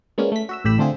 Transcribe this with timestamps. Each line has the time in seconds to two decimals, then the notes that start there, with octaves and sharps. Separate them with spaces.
0.18 G#3 A#3 B3 C#4 D4 F4
0.32 A3 B6
0.49 F#4 E5 E6
0.64 A1 A2 G4 B5 E6
0.79 D3 A3 C4 F4 G#4